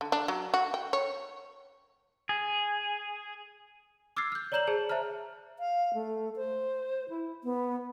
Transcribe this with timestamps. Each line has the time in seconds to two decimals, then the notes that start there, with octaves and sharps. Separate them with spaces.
0.01 D3
0.12 D4
0.28 F#3
0.54 F#4
0.74 G5
0.93 C#5
2.29 G#4
4.17 D6 E6 F6 G#6 A6 C7
4.32 F6 G6
4.52 C#5 D5 A#5 G6 E7 F#7
4.67 G#4 C5 A5
4.89 C5 E5 A5 A#5 F6
5.59 F5
5.94 A3
6.36 C5
7.09 E4
7.44 B3